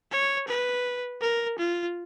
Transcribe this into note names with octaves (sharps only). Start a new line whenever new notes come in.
C#5
B4
A#4
F4